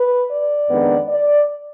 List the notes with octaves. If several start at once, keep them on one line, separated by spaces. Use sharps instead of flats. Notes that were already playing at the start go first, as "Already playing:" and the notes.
Already playing: B4
D5
F2 D#3 G#3 B3 D4
D5